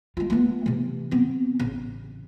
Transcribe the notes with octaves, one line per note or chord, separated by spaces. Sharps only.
G#3 F4
A3 B3
C3 E3
B3 C4
A1 C#3